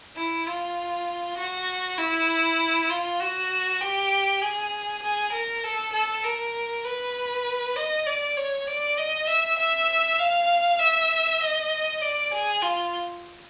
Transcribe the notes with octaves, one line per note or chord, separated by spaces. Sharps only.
E4
F4
F#4
E4
F4
F#4
G4
G#4
G#4
A#4
A4
A4
A#4
B4
D#5
D5
C#5
D5
D#5
E5
E5
F5
E5
D#5
D5
G#4
F4